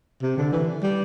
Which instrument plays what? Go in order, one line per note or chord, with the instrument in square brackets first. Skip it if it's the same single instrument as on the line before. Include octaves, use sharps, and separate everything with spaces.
[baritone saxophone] C3
D3
E3
G3